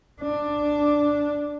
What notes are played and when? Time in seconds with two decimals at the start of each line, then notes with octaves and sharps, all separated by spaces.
0.21 D4